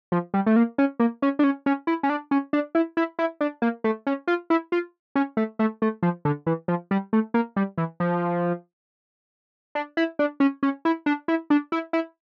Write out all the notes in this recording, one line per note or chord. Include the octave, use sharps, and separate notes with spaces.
F3
G3
A3
A#3
C#4
A#3
C#4
D4
C#4
C#4
E4
C#4
D4
C#4
D4
E4
E4
E4
D4
A#3
A3
C#4
F4
E4
F4
C#4
A3
A3
A3
F3
D3
E3
F3
G3
A3
A#3
G3
E3
F3
D4
E4
D4
C#4
C#4
E4
D4
E4
D4
E4
E4